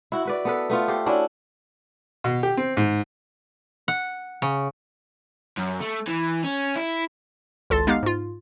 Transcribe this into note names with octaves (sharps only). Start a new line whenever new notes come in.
E4 F#4
E4 B4 D5
B3 A4 B4
A3 B3 F4
G4 A4 C5
C#4 D4 E4 F#4
B2
G4
C4
G#2
F#5
C#3
F#2
A3
E3
C#4
E4
G#1 C#2 A4 A5 C6 A6
G#3 B3 D#4 G4 F5 F6
G#2 F4